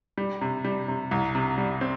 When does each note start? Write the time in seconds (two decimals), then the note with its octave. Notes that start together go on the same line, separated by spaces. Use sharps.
0.17 G3
0.41 C3
0.64 G3
0.88 C3
1.11 C2
1.35 C3
1.58 G3
1.81 C4